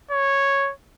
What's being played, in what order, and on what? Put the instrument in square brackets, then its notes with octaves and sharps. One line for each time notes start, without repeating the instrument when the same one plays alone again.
[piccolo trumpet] C#5